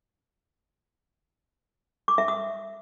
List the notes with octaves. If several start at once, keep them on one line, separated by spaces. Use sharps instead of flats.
D6
E5
D#6